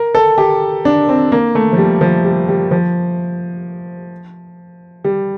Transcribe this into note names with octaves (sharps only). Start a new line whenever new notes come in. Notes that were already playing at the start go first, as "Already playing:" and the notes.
Already playing: A#4
A4
G4
D4
C4
A#3
A3
F3
G3
F3
G3
G3
F3
G3